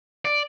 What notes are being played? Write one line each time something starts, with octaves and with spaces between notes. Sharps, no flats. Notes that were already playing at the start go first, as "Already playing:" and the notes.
D5